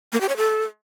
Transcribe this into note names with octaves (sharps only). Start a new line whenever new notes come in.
A#3
G4
C#5
A4